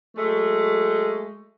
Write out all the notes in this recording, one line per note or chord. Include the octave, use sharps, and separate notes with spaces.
F#3 G#3 A3